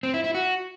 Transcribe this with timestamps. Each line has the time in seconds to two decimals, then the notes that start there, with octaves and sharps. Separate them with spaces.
0.03 C4
0.14 E4
0.24 E4
0.35 F#4